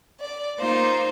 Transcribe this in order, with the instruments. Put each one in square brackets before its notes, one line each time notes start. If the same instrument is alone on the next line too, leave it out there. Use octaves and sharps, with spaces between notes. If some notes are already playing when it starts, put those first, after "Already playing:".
[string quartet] D5
A#3 D#4 F4 C5